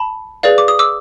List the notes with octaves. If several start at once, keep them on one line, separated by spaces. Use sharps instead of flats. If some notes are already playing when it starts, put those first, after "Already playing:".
Already playing: A5 B5
G#4 B4 D5 F5
D6
D#6
D6 E6